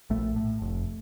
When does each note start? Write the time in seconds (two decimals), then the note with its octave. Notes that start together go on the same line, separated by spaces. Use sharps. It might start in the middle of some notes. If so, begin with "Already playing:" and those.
0.10 A#1 A3
0.36 A2
0.62 F1